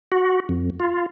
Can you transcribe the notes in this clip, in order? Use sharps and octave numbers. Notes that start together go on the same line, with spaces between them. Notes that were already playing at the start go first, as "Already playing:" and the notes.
F#4
F2
F4